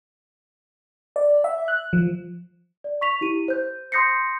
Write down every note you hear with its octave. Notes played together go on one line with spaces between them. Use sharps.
D5
E5
F#6
F3
D5
C#6 B6 F7
E4 G4 D#7
C5 G6
C6 D#6 G6 A#6 C7 C#7